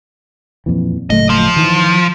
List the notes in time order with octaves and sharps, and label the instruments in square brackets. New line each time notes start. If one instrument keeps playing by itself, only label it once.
[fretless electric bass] F2 A#2 E3
[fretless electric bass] F#1 A2 A3 [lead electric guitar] D#5
[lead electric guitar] F3
[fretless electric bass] D#3 E3